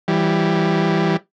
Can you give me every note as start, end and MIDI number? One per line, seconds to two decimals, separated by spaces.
0.08 1.17 52
0.08 1.17 55